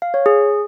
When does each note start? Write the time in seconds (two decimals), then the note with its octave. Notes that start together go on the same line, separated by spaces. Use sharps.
0.02 F5
0.14 C#5
0.26 G#4